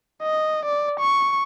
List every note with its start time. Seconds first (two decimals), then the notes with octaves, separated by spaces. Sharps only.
0.23 D#5
0.66 D5
1.00 C#6